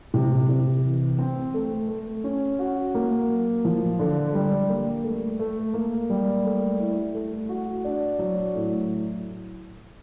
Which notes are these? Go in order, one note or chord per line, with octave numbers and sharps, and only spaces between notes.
C3
C3
E3
C4
A3
A3
C#4
F#4
A#3
F#3
F3
D3
G3
A#3
A3
A3
A#3
G3
A3
E4
A3
F#4
D4
F#3
A2